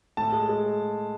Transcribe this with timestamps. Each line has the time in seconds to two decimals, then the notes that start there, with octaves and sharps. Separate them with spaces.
0.17 A2 A5
0.33 G#3
0.49 G#3